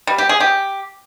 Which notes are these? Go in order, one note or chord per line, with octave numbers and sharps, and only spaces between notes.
G3
G4
G#4
G4